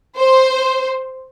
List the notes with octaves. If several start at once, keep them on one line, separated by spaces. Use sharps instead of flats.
C5